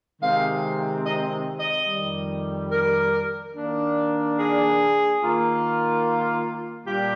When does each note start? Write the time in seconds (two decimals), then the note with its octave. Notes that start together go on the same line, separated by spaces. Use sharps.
0.21 C3 D#3 G#3 C4 F5
1.05 D#5
1.60 D#5
1.87 F2 D#3 G3
2.71 A#4
3.54 D#3 A#3 D4
4.37 G#4
5.20 D#3 A#3 F4
6.86 A#2 G3 D4 F4 G4